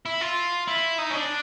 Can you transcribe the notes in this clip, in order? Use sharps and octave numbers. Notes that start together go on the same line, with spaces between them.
E4
F4
E4
D#4
C#4
D4